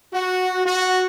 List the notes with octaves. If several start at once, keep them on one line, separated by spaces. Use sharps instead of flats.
F#4
F#4